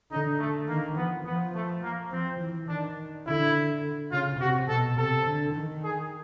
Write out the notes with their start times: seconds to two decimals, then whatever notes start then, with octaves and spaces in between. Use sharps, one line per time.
0.11 D3 D#4
0.39 A3
0.68 D#3 A#3
0.96 F3 B3
1.26 F3 B3
1.54 A3
1.83 A#3
2.11 F3 C4
2.40 E3
2.68 D#3 D4
3.26 D3 E4
4.12 C#3 F4
4.40 C3 F#4
4.68 B2 A4
4.98 C3 A4
5.26 D3
5.54 D#3
5.83 G#4